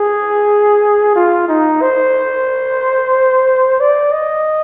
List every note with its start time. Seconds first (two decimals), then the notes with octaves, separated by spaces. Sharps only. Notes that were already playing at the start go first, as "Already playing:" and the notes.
Already playing: G#4
1.16 F4
1.48 D#4
1.82 C5
3.80 D5
4.12 D#5